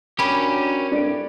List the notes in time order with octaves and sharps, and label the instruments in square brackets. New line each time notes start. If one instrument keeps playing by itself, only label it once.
[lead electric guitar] C#4 G4 [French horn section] D4 F#4 A#4 [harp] B5
[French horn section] G2 A3 C4 [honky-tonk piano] D4 D7